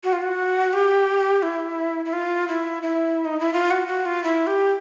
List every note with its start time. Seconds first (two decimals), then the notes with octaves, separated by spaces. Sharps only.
0.04 F#4
0.13 F4
0.22 F#4
0.73 G4
1.43 E4
2.05 E4
2.13 F4
2.48 E4
2.82 E4
3.25 D#4
3.40 E4
3.53 F4
3.71 F#4
3.87 F#4
4.05 F4
4.23 E4
4.47 G4